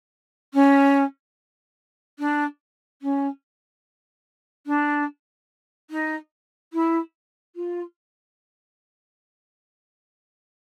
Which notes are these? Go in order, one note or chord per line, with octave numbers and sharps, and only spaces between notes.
C#4
D4
C#4
D4
D#4
E4
F4